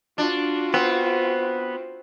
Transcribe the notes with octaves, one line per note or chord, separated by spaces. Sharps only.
D4 F4 F#4
B3 C4